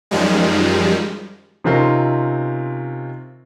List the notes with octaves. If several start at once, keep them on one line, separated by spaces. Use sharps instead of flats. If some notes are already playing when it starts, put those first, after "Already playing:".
F#2 D#3 F3 G3 G#3
C3 D#3 C4 C#4 F4 A#4